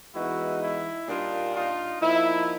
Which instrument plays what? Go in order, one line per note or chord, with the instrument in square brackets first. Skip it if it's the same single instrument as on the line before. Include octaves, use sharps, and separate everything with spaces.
[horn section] E3 G#3 B3 D#4 E4 F#4
E4
A#2 G3 A#3 D4 D#4 F4
D#4 F4
F3 A#3 D#4 E4